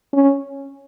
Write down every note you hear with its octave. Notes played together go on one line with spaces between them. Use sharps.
C#4